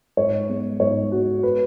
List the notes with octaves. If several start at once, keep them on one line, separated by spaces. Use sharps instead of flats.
G#2 C#5
G#3 B3
G#2 C#5
G#3 B3 F#4
B4